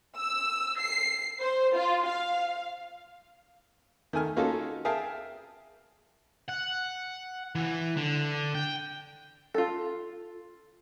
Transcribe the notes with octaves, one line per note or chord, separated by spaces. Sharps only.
E6
C7
C5
F4
F5
D#3 A3 G#5 F6
A#3 C#4 D#4 F4 F#4 A4
G#4 A#4 E5 F5 G5 A5
F#5
E3
D3
G5
F4 A4